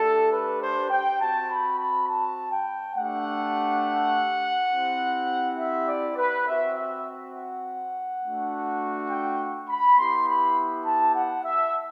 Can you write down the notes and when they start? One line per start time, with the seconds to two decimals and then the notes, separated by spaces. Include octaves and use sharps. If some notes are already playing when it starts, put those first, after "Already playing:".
Already playing: A3 D4 G4 A4
0.32 B4
0.62 C5
0.90 G5
1.20 C4 F#4 A5
1.49 B5
1.78 B5
2.08 A5
2.52 G5
2.95 A3 D4 G4 F#5
4.71 C4 E4 G4
5.59 E5
5.88 D5
6.17 B4
6.46 C4 F#4 E5
6.76 E5
7.34 F#5
8.22 A3 D4 F#4
9.09 G5
9.68 B5
9.98 B3 E4 G4 C6
10.27 B5
10.85 A5
11.15 F#5
11.44 E5